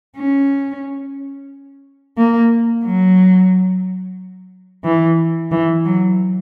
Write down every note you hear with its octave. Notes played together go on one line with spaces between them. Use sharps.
C#4
A#3
F#3
E3
E3
F#3